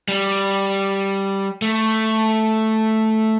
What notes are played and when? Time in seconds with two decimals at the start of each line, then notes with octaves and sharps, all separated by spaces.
0.08 G3
1.62 A3